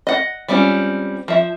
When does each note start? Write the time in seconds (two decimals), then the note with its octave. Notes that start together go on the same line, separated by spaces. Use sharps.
0.07 D#5 F#5
0.48 G3 G#3 C4 C#4 F4
1.28 F3 E5